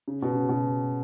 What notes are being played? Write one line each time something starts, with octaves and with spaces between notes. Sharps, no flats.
C#3
B2
C#3
B2